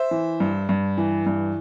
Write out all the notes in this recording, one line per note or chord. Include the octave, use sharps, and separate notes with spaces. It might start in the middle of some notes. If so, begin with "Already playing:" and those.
Already playing: C5 E5
E3
G2
G2
E3
G2